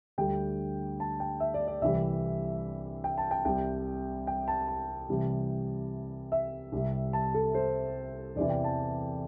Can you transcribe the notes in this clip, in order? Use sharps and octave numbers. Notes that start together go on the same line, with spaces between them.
D2 D3 G3 G5
A5
G5
E5
D5
D5
C2 C3 E3 G3 E5
G5
A5
G5
C2 C3 G3 G5
G5
A5
A5
C2 C3 E3 G3
E5
C2 C3 G3
A5
A4
C5
E2 C3 E3 D5
G5
A5